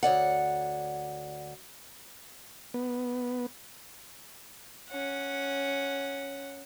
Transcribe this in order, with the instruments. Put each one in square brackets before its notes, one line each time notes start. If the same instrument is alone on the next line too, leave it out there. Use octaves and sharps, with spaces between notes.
[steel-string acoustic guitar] D2 C#5 D5 F#5
[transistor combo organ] B3
[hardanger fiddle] C#4 F#5